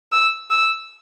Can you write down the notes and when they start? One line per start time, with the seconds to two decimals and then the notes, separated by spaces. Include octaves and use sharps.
0.12 E6
0.51 E6